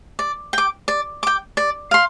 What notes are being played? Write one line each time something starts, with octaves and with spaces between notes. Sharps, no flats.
D5
G5 D6
D5
G5 D6
D5
F5 C6